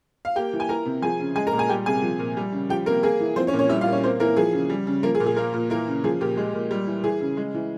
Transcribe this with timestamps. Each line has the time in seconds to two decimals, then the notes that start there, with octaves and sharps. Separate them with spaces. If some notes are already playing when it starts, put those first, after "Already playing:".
0.25 F5
0.36 A#3 G4 G5
0.53 E3
0.60 G#5
0.69 E3 A#4 A#5
0.86 C3
1.02 F3 G#4 G#5
1.20 C#3
1.36 G#3 G#4 G#5
1.47 A#4 A#5
1.53 A#2
1.58 G#4 G#5
1.69 G3 G4 G5
1.86 C3 G#4 G#5
2.02 F3
2.19 A#2
2.37 G3
2.53 C#3
2.69 F3 G4 G5
2.86 C3 A#3 A#4
3.03 A#3 G#4
3.20 E3
3.36 F3 C4 C5
3.47 C#4 C#5
3.53 A#2
3.59 C#4 C#5
3.69 G3 E4 E5
3.81 F4 F5
3.87 A#2
3.92 C#4 C#5
4.03 A#3 C4 C5
4.20 E3 A#3 A#4
4.37 F3 G#4
4.53 C#3
4.70 G3
4.87 C#3
5.03 F3 A#3 A#4
5.15 G#4
5.20 A#2
5.26 G#4
5.36 F3 A#3 A#4
5.54 A#2
5.70 E3 A#3 A#4
5.88 C#3
6.04 F3 G#4
6.21 A#2 G4
6.37 G#3
6.54 A#2
6.71 G3
6.87 E3
7.04 E3 G#4
7.21 C#3
7.37 G#3
7.54 E3